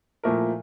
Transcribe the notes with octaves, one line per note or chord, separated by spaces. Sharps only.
A#2 F3 A3 E4 A#4